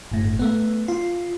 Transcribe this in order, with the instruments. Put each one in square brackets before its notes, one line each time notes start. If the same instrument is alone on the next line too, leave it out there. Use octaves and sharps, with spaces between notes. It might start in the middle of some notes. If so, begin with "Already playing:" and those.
[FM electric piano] G1 A2
A3 B3
F4